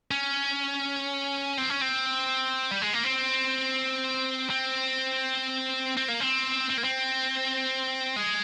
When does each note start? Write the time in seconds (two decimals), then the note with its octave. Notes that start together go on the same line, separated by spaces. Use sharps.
0.11 C#4
1.58 C4
1.70 C#4
1.82 C4
2.71 G3
2.82 G#3
2.93 A#3
3.04 C4
4.50 C4
5.97 C4
6.08 A#3
6.20 C4
6.70 C4
6.77 A#3
6.84 C4
8.16 G#3